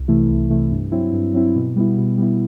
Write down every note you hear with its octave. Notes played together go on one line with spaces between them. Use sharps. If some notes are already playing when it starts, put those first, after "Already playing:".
Already playing: C2
C3 E3 A3 E4
C2
C3 E3 A3 E4
G2
F#3 C4 E4
G2
F#3 C4 E4
B2
G3 B3 E4
B2
G3 B3 E4